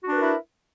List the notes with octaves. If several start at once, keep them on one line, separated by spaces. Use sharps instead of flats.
D4 E4 F#4 A#4 B4